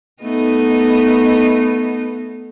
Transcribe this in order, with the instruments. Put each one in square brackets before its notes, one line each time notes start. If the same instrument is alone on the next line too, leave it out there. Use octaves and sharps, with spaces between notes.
[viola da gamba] A3 B3 D#4